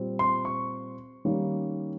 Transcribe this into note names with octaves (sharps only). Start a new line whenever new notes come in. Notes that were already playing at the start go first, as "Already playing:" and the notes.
Already playing: A#2 G3 C4
C6
C#6
D#3 G3 A#3 C#4